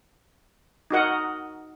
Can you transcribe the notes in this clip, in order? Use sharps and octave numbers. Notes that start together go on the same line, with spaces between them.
D#4 F#4 A#4 D#5 F#5